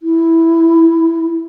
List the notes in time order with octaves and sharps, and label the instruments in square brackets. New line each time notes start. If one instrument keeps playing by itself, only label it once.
[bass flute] E4